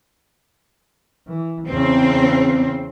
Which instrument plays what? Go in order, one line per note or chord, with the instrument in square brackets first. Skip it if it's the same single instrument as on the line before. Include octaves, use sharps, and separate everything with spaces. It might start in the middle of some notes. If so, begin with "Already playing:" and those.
[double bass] E3
[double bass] E2 C#3 [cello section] C4